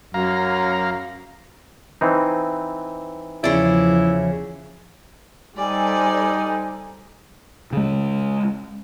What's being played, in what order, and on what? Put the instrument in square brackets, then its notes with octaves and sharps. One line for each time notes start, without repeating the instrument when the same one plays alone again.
[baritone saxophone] F#2 [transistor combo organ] F5 A#5
[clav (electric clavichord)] E3 C4 D#4
[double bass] E2 F3 [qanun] C#3 D5 [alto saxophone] E4
[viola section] G3 A4 C5 [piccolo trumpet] D#4 [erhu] D5 [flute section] G#5
[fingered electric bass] C#3 G#3